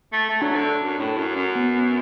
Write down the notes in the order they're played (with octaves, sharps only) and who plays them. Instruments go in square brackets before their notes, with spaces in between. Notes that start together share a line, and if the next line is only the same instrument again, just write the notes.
[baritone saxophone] A3
A3
[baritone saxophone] F#3 [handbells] D4
[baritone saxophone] D3
F#2
A2
F#2
F#2
[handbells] B3